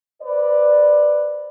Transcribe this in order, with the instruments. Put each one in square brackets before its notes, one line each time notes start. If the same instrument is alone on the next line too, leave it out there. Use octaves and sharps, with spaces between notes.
[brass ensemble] B4 C5 D5